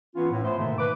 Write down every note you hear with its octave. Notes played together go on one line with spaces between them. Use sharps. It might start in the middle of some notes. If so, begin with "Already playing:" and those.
E3 B3 C#4 F4
A2
A3 B3 C5
G#2 B2 D3 D#3 A3 A#3
B4 D6